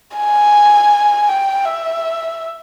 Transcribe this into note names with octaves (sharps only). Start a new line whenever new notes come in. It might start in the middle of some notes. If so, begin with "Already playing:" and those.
G#5
G5
E5